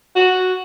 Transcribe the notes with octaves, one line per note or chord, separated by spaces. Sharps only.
F#4